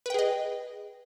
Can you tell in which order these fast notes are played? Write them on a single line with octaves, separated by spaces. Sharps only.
B4 G5 G#4 D#5